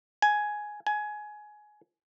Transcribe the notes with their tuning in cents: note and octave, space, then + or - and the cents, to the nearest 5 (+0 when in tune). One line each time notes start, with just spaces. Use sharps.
G#5 +10
G#5 +20